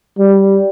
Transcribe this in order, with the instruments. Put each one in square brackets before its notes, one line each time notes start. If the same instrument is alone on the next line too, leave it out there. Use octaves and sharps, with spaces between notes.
[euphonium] G3